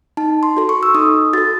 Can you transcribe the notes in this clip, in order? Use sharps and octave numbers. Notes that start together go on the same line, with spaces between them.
D#4 A5
C6
F#4 A4
C#6
E6
D#4 D#6
F#4 A4 A6